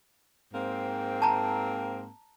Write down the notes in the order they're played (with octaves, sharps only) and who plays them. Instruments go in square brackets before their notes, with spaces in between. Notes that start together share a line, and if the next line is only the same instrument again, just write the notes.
[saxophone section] G#2 A#3 C4
[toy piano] A5 A#5